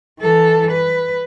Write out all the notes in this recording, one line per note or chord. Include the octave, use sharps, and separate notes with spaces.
E3 A4
B4